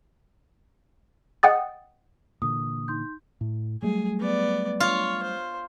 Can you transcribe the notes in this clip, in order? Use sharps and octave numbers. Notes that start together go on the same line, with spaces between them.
D#5 F#5 G5 D#6 A6
A#2 D3 E3 D#6
D#4 C6 G6
A2
F#3 G3 A3 G#4
B3 D5
F4 C#5
C5